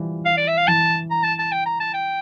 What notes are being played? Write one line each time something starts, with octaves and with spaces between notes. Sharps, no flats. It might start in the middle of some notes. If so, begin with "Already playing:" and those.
Already playing: E3 F3 G3
F5
D5
E5
F5
E3 A5
A#5
A5
A5
G5
A#5
A5
G5